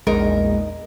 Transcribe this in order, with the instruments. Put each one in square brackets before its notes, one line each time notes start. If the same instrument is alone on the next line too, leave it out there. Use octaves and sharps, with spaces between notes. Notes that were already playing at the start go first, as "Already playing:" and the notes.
[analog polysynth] A#1 E2 [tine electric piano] G#3 [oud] D#4 [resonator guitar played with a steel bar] A#4